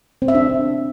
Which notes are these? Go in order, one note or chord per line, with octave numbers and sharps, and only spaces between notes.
C4
E5
D4